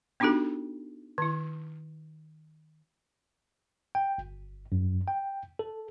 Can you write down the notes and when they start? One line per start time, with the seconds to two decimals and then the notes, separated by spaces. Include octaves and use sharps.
0.20 B3 D4 D#4 F#4 G4 A4
1.18 D#3 E4
3.95 G5
4.18 G1
4.72 F#2
5.08 G5
5.59 A4